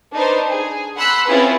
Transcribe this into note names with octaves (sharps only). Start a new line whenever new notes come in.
D4 D#4 B4 C5
G#4
F#5 B5 C6 E6 F#6
C4 C#4 E4 F4 G#4 B4